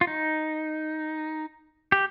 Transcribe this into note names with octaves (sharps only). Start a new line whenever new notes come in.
F4
D#4
G4